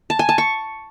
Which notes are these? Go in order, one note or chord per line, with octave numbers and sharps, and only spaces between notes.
A5
G#5
A5
C#6